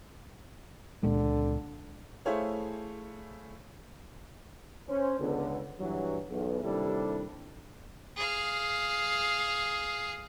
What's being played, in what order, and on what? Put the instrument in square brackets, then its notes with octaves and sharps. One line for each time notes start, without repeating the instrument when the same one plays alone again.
[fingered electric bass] C#2 A#2 G#3 [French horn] D3
[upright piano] A3 E4 G#4 C5 C#5 F5
[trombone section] C#4 C5
C#2 D3 B3
G2 E3 F#3
B1 E2
D#2 C3 G3 D4 E4 A4
[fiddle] G#4 F5